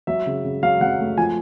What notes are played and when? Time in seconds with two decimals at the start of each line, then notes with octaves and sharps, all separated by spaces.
0.07 F#3 E5
0.26 C#3
0.45 C#3
0.63 F#3 F5
0.81 F#3 F#5
0.99 A3
1.17 F3 G#5